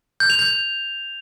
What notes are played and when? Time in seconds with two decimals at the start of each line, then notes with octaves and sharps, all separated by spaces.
0.20 G6
0.30 F7
0.39 G6